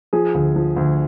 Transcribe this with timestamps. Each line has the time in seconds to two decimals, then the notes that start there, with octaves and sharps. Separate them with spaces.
0.13 F3 G#4
0.35 D2
0.56 F3
0.76 D2